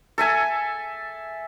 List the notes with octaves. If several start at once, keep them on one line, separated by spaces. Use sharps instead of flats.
A4 E5 G#5